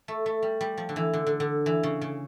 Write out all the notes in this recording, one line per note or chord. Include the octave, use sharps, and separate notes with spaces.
A3
A3
G3
G3
F3
D3
E3
D3
D3
D3
E3
C#3
C#3